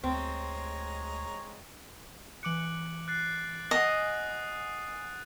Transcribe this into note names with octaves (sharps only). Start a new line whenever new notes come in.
D2 G#3 C4 C#5 A#5
E3 D6 F#6 C#7 D7 F#7
F#6 A6 C7
D#5 F#5 G#5 D#6 C7 D#7